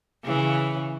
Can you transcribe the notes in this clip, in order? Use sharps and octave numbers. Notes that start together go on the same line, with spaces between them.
C#3 E3